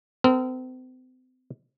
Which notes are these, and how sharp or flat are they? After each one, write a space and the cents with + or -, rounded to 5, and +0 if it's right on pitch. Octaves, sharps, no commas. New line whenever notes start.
C4 -40 A#4 -45